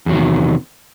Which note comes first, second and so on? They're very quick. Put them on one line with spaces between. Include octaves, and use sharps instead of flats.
E2 F#3 D#3 C3